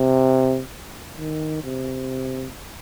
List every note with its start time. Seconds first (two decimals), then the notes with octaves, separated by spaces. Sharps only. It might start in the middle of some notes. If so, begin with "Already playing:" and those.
Already playing: C3
1.17 D#3
1.64 C3